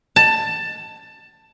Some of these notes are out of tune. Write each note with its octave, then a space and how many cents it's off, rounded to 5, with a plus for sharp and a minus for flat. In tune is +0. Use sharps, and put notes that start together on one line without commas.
A5 +15